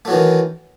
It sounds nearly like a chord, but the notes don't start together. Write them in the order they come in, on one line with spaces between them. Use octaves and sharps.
A3 F#3 E3 D#3